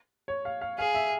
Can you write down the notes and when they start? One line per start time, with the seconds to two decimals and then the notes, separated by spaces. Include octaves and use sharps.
0.28 C#5
0.45 F5
0.61 F5
0.78 G#4 F5
0.95 E5